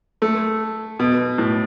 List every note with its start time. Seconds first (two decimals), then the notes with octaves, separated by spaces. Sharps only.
0.22 A3
0.99 B2
1.38 A2